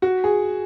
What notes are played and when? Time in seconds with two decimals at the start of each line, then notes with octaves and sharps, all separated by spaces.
0.02 F#4
0.24 G#4